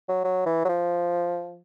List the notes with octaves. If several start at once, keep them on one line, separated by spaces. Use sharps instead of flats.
F#3
F#3
E3
F#3
F3